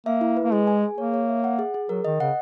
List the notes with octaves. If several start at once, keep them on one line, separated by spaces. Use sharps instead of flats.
A#3 E5
E4
B4
A#3
G#3 G#4
G#5
G#4
A#3 C#5
C#5
E5
F#5
G#4
G#4
F#3 A#4
D#3 D#5
C#3 F#5